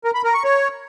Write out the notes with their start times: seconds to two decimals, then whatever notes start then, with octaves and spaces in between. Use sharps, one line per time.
0.04 A#4
0.14 B5
0.24 A#4
0.34 C#6
0.44 C#5